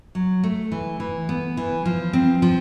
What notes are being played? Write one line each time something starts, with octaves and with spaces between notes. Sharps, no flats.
F#3
A3
E3
E3
B3
E3
F3
C4
F3